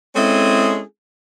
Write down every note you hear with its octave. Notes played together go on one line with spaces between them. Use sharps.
G#3 C4 C#4 E4 G#4 A4